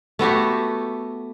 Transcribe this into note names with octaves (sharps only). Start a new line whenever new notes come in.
A3 B3 F#4 G4